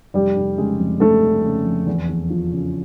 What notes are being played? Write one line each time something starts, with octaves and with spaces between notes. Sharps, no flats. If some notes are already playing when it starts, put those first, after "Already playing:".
F1 G3 G4
F1
C#3 G#3 G#4
F2
F1 A3 A4
F1
C#3
F2
E2
E2
F3
C#3